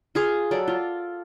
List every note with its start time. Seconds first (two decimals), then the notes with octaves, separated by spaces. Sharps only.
0.15 F4 G#4 F5
0.51 F#3 A4 D5
0.68 F4